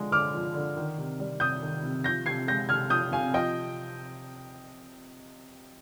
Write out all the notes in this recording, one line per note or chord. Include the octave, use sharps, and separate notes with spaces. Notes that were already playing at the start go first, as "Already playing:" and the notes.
Already playing: D3 F3 G#3
D3 D6 F6
F3
D3
D#3
C3
G3
C3 D#6 G6
D#3
C3
F3 G6 A#6
C3 G#6 C7
G#3 G6 A#6
C3 F6 G#6
F3 D#6 G6
C3 F5 G#5
F3 D#5 G5